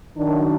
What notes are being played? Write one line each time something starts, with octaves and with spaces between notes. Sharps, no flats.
F#2 D#3 D4